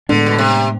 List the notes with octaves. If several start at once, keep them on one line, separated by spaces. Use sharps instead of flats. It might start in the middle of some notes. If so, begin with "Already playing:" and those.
A2 D3 G#3 B3 D4
B2
C3